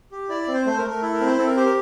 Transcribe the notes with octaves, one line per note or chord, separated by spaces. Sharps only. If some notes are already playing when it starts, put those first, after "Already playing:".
G4
E4 D5
D5
C4
C5
A3 C5
A#4
A3
A#4
E4 A4
A#4
C4
C5
C4 A4
A#4
G4 C5
A#4